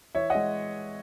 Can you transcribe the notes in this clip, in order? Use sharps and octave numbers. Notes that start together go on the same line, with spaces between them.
E3 C#5 E5
G#3 D#5 F#5